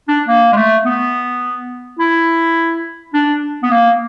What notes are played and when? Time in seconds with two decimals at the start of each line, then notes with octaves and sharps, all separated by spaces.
0.08 D4
0.28 A#3
0.53 G#3
0.56 A3
0.85 B3
1.99 E4
3.14 D4
3.63 B3
3.71 A#3